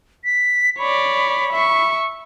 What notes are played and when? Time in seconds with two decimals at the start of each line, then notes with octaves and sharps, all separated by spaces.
0.25 B6
0.79 C#5 D5 B5
1.52 E5 C#6